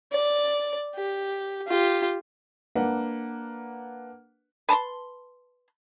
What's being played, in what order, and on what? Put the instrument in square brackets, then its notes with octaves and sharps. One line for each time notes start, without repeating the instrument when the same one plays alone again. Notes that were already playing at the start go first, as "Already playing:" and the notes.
[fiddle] D5
G4
F4 G4
[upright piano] A#3 D4 B4 F#5
[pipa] B4 A5 A#5 C6